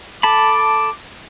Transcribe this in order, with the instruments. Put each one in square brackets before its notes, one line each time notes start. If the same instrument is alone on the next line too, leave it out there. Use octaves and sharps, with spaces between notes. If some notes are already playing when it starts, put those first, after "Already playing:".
[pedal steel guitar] A4 A5 B5 [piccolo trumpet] D6